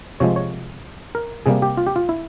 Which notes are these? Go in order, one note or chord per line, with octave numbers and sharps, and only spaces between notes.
C3 F3 G#3 C#5
C#5
A#4
C3 G3 A#3 G#4
G4
F4
G4
F4
E4